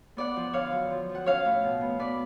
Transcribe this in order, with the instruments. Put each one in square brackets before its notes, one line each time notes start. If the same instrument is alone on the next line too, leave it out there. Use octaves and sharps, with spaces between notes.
[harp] B3 D5 F#5
F3
D3 C#5 F5
F#3
F3
F3
F#5
C#4 C#5 F5
A2
B2
B3
B3 B4 D5